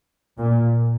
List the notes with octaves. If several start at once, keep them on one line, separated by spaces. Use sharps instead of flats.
A#2